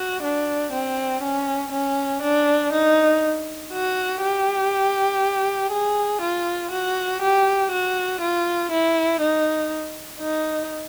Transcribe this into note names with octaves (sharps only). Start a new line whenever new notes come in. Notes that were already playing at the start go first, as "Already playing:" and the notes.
Already playing: F#4
D4
C4
C#4
C#4
D4
D#4
F#4
G4
G#4
F4
F#4
G4
F#4
F4
E4
D#4
D#4